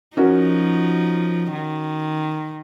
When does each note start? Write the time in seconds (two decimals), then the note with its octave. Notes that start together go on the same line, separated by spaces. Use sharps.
0.17 F3 C#4 D#4 F#4 A#4
1.52 D#3